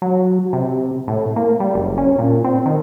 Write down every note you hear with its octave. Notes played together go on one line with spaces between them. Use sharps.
F#3
C3
A2
A#3
G3
F#1
C#4
A#2
C4
D#3